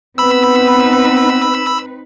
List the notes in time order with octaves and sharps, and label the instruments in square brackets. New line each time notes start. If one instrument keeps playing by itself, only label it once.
[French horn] B3 [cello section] C4 D#4 B4 [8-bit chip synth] B5 E6